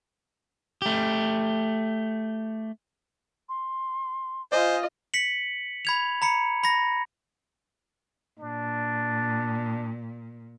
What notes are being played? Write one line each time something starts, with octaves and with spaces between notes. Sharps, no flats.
A3 G4
C6
F4 C5 D#5 G#5
B6 C#7 F#7
B5 G#6 F7
A#5 B5 C#7
B5 A#6
A#2 D4